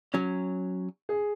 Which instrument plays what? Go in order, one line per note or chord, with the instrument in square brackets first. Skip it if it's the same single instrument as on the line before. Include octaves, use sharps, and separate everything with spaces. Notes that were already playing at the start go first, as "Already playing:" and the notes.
[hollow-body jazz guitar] F#3 C#4
[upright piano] G#4